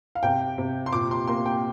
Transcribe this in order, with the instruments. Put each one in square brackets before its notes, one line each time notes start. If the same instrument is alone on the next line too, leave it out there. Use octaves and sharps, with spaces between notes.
[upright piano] F5
C3 G5
C3
C6
A#2 D6
C6
A#3 C6
G5